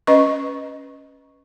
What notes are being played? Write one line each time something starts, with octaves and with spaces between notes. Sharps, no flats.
C#4 B4 D#5 C#6